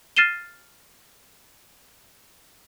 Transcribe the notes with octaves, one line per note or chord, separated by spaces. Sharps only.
F6 A6 C7 D#7 E7 G7